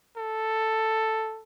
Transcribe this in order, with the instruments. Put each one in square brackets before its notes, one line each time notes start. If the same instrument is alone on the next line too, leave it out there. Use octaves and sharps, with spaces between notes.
[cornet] A4